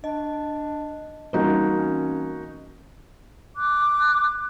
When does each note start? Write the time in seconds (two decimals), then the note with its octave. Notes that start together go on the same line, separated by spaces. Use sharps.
0.04 D4 D#5
1.33 E3 G3 A#3 C4 C#4 D#4 F#4
1.72 C#4
3.57 D6 F#6